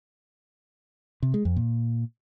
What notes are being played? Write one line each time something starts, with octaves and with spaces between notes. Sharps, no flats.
C3
G#3
F2
A#2